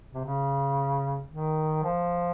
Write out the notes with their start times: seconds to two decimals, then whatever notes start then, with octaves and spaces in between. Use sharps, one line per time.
0.14 C3
0.25 C#3
1.32 D#3
1.84 F3